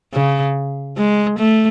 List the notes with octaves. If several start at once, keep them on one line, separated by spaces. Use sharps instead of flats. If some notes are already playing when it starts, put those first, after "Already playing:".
C#3
G#3
A3